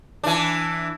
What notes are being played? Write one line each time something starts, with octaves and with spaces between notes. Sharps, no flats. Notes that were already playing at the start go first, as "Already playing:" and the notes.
E3 D4